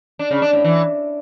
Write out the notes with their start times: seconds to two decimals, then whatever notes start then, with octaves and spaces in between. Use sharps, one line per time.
0.19 D4
0.31 C#3
0.42 D4
0.53 A2
0.64 E3